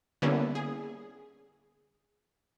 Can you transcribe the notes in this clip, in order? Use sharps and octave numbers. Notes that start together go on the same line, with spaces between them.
D3 G3 A#3 B3 C#4 E4
G#4